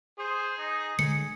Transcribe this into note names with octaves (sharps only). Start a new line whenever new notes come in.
G#4 C5
D#4
D3 G#3 G#4 C#7